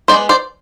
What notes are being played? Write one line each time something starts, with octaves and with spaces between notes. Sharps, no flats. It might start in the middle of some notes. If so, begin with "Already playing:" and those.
G#3 B3 D4 C5 D5
C5 D5